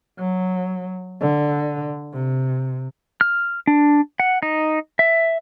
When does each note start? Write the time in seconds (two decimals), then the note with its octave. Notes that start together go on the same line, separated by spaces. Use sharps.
0.19 F#3
1.21 D3
2.14 C3
3.21 F6
3.67 D4
4.20 F#5
4.43 D#4
4.99 E5